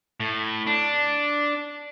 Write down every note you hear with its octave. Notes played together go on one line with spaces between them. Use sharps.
A2
D4